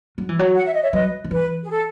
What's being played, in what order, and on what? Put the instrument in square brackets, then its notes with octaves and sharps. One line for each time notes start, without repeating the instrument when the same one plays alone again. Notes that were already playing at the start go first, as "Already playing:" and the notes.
[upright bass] F#3
E3
F#3
[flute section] F#5
E5
D#5
C#5 E5
[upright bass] F#3 [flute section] B4 D#5
[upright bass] D#3
[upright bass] E3 [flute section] B4
[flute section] G#4
A4